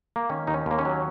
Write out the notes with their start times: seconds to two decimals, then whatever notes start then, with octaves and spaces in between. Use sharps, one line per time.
0.16 A#3
0.29 D#3 C#4
0.47 D#2 D#4
0.54 C#4
0.66 D#2 A#3
0.78 C#4
0.85 F#3